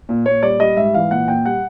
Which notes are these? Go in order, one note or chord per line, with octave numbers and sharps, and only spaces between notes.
A#2
A#2 C#5
G3 D5
G3 D#5
G#2 E5
E3 F5
A#2 F#5
A#2 G5
G3 F#5